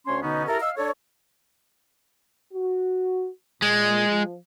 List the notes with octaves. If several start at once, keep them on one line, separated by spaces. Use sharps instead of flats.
D2 C#4 C#5 C6
B2 D3 B3 C#4 D#4
E4 G4 A4 A#4
D#5 F5 E6
D4 A4 C#5
F#4
A#2 G#3
F3